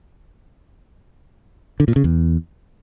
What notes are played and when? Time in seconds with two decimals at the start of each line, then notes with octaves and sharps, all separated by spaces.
1.80 D3
1.88 A#2
1.96 C#3
2.04 E2